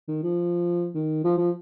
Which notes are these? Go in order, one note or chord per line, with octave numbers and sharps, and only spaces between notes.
D#3
F3
D#3
F3
F3